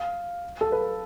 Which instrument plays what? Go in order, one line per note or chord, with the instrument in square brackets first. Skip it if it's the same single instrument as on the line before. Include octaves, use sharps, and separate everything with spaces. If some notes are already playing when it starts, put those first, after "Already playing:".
Already playing: [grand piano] F5
A4
B4